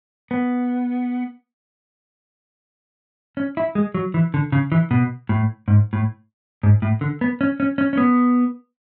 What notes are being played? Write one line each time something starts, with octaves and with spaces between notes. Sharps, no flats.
B3
C#4
E4
G#3
F#3
E3
D3
C#3
E3
B2
A2
G#2
A2
G#2
A2
D3
B3
C#4
C#4
C#4
C#4
B3